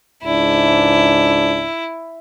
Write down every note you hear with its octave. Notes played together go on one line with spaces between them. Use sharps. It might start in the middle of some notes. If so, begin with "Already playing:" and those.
C#2 G#2 D4 E4